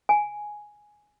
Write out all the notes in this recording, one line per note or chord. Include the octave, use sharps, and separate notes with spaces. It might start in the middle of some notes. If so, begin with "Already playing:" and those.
G#5